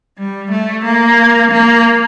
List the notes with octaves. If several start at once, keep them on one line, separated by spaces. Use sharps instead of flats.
G3
A3
A#3
A#3